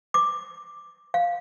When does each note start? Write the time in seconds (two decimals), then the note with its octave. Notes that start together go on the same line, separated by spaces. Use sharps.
0.14 D6
1.14 F5